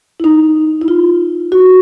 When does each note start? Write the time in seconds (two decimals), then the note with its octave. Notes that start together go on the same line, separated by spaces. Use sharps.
0.20 E4
0.24 D#4
0.81 E4
0.88 F4
1.52 F#4